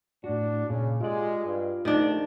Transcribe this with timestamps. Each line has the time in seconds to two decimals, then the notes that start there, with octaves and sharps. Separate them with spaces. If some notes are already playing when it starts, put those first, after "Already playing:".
0.24 A2 D4 F#4
0.69 A#2 C#3
1.01 G#3 F4 G4 D5
1.45 G2
1.85 A#1 D#3 A3 D4 D5